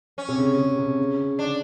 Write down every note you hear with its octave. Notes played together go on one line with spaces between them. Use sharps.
C#4
C3
C#3
C#3
C3
C#3
C#3
D3 D4